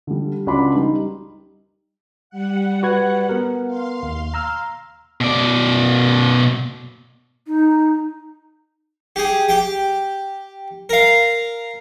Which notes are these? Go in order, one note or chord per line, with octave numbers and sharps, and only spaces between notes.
D3 G3
C#2 D4 F#4 B5 C6 D6
G3 D#4
G3 F#5
F#4 B4 G#6
B3 A#4
F5 C6
D#2
A#5 E6 F6
B2 D5
D#4
G4 G#4
G4 G5
A#4 F5